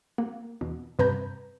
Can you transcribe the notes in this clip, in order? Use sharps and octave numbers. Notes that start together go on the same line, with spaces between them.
A#3
E2 B2
G2 C3 B4 A5 A#5 G6